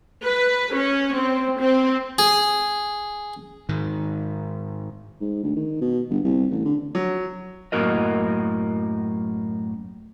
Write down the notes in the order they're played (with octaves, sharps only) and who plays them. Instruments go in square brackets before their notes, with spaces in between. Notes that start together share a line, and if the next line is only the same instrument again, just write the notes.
[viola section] B4
C#4
C4
C4
[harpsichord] G#4
[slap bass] G#2 D#3
[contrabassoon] G#2
D2
D#3
B2
G1
C2
A1
D3
[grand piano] F#3
[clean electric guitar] F#2 A2 A#3 F#4 A#4 D#5